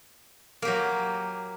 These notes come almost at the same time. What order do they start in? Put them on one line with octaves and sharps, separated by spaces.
A#3 G4 F#3